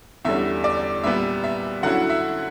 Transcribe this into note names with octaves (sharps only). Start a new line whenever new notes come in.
E2 D3 G3 C#4 E5
D5
A#2 G3 B3 E5
E5
D3 F#3 C#4 E4 F#5
E5